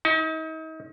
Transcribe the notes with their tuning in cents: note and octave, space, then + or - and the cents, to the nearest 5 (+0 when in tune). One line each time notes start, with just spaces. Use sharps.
D#4 +40